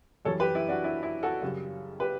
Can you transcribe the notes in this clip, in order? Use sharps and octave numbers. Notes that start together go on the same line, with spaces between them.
F#2 E3 G3 A4 C#5
G4 B4
E4
D4 F#4
E4
E4
F#4 A4
F#2 C#3 G3
G4 B4